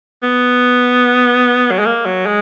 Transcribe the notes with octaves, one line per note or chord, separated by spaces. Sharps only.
B3
F#3
G#3
A#3
F#3
G#3